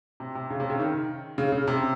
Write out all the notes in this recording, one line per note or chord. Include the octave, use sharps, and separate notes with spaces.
C3
C3
C#3
C3
C#3
D#3
C#3
C#3
C3